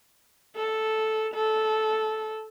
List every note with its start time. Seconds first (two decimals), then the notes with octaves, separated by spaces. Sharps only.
0.56 A4
1.35 A4